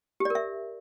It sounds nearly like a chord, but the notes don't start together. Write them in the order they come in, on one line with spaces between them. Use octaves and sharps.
G4 D5 A#4 E5